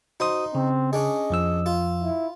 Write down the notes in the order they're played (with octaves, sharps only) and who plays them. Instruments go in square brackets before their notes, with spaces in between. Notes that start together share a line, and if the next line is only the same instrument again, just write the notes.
[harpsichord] D#4 C6 [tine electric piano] F#4 C5 D#6
[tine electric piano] C#3 [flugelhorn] C4
[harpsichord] C#4 D4 G#4 [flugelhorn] D#5
[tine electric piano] F2 F3 E6
[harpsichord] F4
[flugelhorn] E4